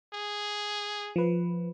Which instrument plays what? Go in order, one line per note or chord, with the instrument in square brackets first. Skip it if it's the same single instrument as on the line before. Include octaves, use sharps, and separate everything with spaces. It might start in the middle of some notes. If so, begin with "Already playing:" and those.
[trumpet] G#4
[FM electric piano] F3 B4